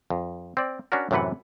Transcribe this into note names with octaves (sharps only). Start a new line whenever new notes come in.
F2
C4 D5
C#4 D4 F#4 A#4
F#2 A2 C3 E3 B4 F#5